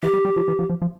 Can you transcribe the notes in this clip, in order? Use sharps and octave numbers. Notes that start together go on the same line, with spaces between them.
E3 G4
G3
G3
F3
E3
F3
F3
F3